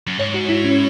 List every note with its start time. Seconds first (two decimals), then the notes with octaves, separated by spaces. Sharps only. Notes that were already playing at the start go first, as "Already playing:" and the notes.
0.07 F#2
0.19 G#2 C#5
0.34 F#4
0.49 E4
0.64 C#4